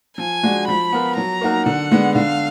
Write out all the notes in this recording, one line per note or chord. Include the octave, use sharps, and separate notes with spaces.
F3 G#5
G#3 D4 F#4
F3 B5
B3 F4 A#4
F#3 A#5
A#3 D#4 F#4 A#4
D3 F#5
G#3 B3 D4
D3 F5